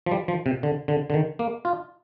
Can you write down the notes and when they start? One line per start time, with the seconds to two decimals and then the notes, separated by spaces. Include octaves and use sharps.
0.06 F3
0.11 G3
0.28 F3
0.46 C3
0.63 D3
0.88 D3
1.10 D3
1.14 D#3
1.39 A#3
1.65 F4